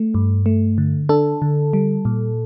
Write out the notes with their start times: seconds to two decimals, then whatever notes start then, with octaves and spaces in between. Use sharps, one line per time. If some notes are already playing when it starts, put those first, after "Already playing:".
Already playing: A3
0.14 G2
0.46 A3
0.78 D3
1.09 D4 A4
1.42 D3
1.73 G3
2.05 A#2